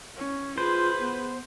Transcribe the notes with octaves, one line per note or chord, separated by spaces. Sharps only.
C#4
F4 G#4 B4 C5
B3